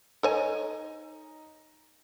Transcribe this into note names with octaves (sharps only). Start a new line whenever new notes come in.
D#4 A4 C#5 G#5